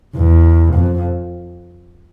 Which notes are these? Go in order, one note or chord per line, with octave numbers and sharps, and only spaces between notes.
E2
F2